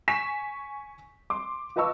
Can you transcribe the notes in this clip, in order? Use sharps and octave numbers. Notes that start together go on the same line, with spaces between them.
G#5 C#6 B6 E7
C6 D6
F4 B4 D#5 A5 C#6 E6